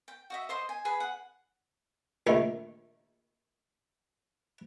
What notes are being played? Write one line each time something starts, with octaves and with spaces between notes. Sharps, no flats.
G5
F#4 D#5 E5
C5 D#5 C6
G#5
G#4 B4
F#5
A#1 D#3 A3